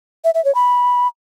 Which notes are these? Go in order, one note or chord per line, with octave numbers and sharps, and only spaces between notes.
E5
E5
C#5
B5